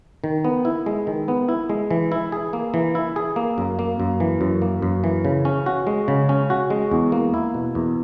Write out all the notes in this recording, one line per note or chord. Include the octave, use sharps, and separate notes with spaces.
D#3
B3
E4
G#3
D#3
B3
E4
G#3
E3
E4
G#4
A#3
E3
E4
G#4
A#3
F#2
A#3
F#2
E3
F#2
A#3
F#2
E3
C#3
C#4
F#4
G#3
C#3
C#4
F#4
G#3
E2
A#3
E4
B2
E2